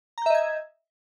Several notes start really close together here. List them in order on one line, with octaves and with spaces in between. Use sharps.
A#5 G6 E5 D#5 G#6